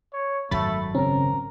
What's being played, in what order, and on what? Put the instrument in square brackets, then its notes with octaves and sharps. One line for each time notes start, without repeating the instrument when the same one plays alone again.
[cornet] C#5
[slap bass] G#1 F#2 F#3 [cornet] A3 [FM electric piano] B5 A6
[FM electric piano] C#3 C4 C#4 [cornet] A#4